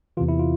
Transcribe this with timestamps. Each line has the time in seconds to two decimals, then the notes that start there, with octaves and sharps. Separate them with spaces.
0.17 E2 C3 E3 F4
0.28 E4
0.40 F4